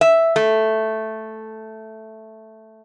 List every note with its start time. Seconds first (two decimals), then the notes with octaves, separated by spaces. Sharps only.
0.01 E5
0.36 A3